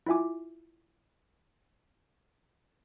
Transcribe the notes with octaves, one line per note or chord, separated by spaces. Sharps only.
E4 F4 E5 G#5 D6